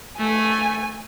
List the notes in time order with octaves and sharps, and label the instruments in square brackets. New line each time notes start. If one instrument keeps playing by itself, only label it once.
[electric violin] A3 [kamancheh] G#5